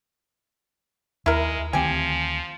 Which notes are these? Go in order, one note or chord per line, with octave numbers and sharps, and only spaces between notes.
D#2 G#3 E4 A#4
D2 D#3 F3 C4 G4 G#5